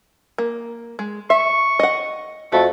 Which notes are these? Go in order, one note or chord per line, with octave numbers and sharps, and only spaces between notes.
A#3
G#3
E5 C#6
D#5 F#5
F2 A3 F#4